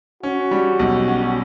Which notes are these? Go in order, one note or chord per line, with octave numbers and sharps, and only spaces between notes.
C#4 F#4
G3
B1
C#4